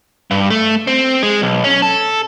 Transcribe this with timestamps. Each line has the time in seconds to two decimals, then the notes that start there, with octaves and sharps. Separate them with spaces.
0.31 G2
0.50 A3
0.87 C4
1.23 G#3
1.42 B1
1.64 C#4
1.82 A4